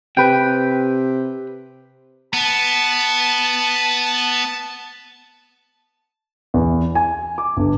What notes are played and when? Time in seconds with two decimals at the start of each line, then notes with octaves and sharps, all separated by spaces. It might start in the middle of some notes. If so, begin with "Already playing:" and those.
0.17 C3 B4 G5
2.34 B3 A5
6.54 E2
6.95 G#5
7.38 D6
7.57 G1